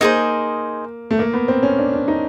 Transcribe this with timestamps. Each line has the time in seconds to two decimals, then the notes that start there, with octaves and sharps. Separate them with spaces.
0.01 A#3 D#4 G#4 C5
1.11 A3
1.19 A#3
1.34 B3
1.48 C4
1.63 C#4
1.78 D4
1.93 D4
2.08 D#4